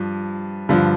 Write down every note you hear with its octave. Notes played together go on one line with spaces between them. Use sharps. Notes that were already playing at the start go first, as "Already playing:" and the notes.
Already playing: G2 F3
G2 D3 F3